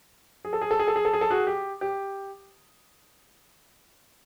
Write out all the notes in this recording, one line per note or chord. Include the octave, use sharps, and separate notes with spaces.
G#4
A4
G#4
A4
G#4
A4
G#4
A4
G#4
A4
F#4 G#4
G4
G4